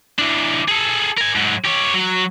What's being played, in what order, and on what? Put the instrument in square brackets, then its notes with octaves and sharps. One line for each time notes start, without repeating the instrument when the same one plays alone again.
[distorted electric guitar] E3 D4
G#4 A4
A#4 G#5
G#2 F#3
G4 C#5
F#3